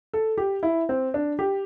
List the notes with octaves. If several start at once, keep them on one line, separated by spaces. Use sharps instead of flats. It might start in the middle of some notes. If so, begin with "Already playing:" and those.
A4
G4
E4
C4
D4
G4